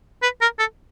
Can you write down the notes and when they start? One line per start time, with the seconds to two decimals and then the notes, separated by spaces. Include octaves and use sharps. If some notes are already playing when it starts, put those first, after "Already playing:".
0.23 B4
0.41 A#4
0.59 A4